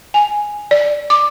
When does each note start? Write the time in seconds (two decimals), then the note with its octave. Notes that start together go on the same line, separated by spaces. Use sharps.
0.14 G#5
0.71 D5
1.10 D6